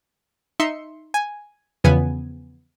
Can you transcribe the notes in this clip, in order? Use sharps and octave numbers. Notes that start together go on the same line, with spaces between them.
D#4 E5 C6 C#7
G#5
E2 C#3 F3 B3 G#5